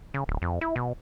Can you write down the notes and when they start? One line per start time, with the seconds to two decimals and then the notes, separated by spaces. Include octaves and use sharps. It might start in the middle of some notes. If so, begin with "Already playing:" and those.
0.14 C#3
0.28 D1
0.42 F2
0.61 E4
0.76 B2